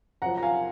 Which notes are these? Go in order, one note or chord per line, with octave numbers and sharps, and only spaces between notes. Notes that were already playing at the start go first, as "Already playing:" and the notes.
F#2 F3 F#5 A#5
A#5
F5 G#5